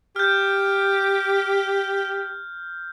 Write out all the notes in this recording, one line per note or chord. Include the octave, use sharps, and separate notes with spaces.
G4 F6 G6